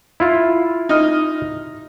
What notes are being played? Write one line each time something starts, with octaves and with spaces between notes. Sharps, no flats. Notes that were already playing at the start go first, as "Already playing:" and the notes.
E4 F4
D#4 F6